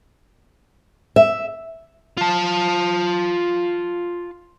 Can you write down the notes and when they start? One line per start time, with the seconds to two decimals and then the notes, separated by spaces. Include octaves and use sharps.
1.16 E5
2.18 F4 A5